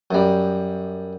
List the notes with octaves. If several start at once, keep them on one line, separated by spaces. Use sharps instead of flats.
F#2 G3